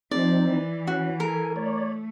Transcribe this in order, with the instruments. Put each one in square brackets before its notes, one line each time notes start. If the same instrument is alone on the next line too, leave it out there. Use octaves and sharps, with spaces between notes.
[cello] F3 [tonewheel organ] C4 D#4 [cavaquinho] D5
[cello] E3
[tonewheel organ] C#4 [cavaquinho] F#4
[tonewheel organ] A4 G#5 [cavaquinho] A#4
[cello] A3 [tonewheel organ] C#5 D5